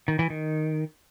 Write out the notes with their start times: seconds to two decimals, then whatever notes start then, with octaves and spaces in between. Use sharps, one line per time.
0.08 D#3
0.19 E3
0.30 D#3